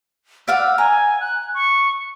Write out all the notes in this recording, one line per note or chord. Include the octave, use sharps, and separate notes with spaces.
D5 F5 F#5 E6
G#5 A#5
F#6
C#6